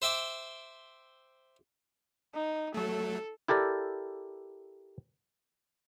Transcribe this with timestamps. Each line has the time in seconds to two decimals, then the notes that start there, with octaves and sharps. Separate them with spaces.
0.02 C5 E5 G5 D6
2.34 D#4
2.74 F#3 A3 A4
3.48 E4 G4 A4 A#4 D5